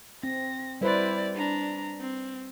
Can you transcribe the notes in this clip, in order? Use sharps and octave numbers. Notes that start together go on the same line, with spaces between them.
C4 A#6
G3 E4 B4 C5 D5
D4 A#5
C4